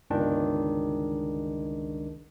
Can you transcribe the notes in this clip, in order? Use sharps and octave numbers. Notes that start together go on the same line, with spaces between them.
G1 C#2 D#3 D4